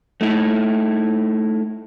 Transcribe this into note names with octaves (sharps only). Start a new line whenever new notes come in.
A3 D#4 E4